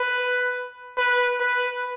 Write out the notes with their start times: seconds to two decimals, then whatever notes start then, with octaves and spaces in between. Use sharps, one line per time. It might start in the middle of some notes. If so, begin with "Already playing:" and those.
Already playing: B4
0.97 B4
1.40 B4